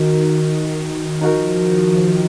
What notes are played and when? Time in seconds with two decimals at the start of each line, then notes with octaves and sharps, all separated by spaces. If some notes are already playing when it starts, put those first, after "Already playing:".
Already playing: D#3 D#4 F#4 A#4
0.41 D#3
1.21 F3 D#4 F#4 A#4
1.62 D#3